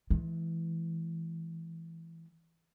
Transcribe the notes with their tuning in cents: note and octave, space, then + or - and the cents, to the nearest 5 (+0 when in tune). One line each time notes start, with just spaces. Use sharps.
E3 +5 G#3 +45